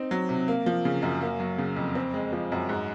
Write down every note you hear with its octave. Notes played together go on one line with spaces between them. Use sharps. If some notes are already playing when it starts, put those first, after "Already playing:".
Already playing: C4 D#4
F#3
C3
A#3
F3
C#3
F#2
A#3
F#3
C#3
F2
C4
G#3
F3
F#2
G#2